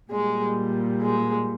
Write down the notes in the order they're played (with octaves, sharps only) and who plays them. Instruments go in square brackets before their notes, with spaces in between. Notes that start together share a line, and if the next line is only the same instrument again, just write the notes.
[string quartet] A#2 G3 G#3
G#3